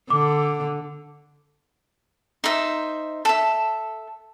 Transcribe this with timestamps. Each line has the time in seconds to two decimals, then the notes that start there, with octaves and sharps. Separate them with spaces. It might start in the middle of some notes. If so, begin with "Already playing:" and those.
0.10 D3 D6
2.44 D#4 C5 E5
3.25 A4 E5